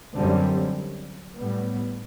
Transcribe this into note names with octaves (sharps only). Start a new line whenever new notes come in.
F#2 D3 G3 C4
A2 G3 B3